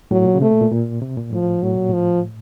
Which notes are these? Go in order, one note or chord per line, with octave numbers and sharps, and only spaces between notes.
A2 F#3
A#2
C#3
C3 A3
A#2
A#2
A#2
C3
A#2
A2 F3
A2 F#3
A#2
A2 F3